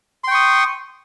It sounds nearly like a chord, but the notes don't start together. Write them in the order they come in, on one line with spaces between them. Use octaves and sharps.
C6 G5 C#6 D#6